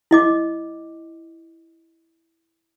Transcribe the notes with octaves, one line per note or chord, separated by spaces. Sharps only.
E4 D#5 D6